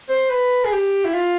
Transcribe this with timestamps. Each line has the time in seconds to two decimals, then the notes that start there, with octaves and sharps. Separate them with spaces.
0.09 C5
0.30 B4
0.64 G#4
0.72 G4
1.05 E4
1.14 F4